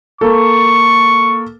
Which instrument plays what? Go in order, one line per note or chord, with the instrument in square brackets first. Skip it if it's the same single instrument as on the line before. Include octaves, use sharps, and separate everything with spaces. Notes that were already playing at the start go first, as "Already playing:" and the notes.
[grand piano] A#3 A4 [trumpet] C#6